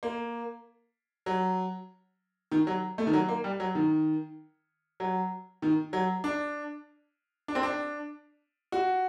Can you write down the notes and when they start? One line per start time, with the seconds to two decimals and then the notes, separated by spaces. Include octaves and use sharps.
0.03 A#3
1.26 F#3
2.52 D#3
2.67 F#3
2.98 A3
3.07 D#3
3.13 F#3
3.29 A#3
3.44 G3
3.60 F#3
3.75 D#3
5.00 F#3
5.62 D#3
5.93 F#3
6.24 D4
7.48 D4
7.55 C4
7.63 D4
8.72 F#4